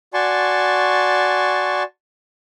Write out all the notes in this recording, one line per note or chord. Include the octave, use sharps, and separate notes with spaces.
F#4 D5 G#5 A5 C6 C#6